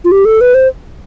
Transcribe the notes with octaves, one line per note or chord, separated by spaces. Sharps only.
F4
G4
A4
B4
C5